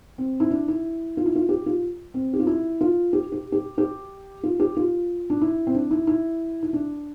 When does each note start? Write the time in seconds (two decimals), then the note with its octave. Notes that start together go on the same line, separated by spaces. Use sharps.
0.18 C4
0.40 E4
0.51 D4
0.68 E4
1.17 F4
1.26 E4
1.35 F4
1.49 G4
1.66 F4
2.14 C4
2.33 G4
2.40 F4
2.47 E4
2.81 F4
3.13 G4
3.32 G4
3.52 G4
3.78 G4
4.43 F4
4.60 G4
4.77 F4
5.30 D4
5.41 E4
5.67 C4
5.75 D4
5.91 E4
6.07 E4
6.63 E4
6.73 D4